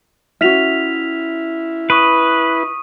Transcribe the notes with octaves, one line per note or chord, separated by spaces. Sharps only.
C#4 E4 F#4 E5 F6 B6 F7
B4 C#6 D#6 D#7